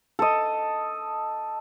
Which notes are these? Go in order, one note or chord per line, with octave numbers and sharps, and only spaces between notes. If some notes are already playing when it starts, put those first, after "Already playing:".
A4 D#5